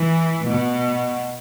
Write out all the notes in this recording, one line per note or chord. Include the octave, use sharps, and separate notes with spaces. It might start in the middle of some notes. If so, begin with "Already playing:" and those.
Already playing: E3
B2